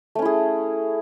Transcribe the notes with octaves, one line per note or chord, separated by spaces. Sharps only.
A3 C#4 E4 G#4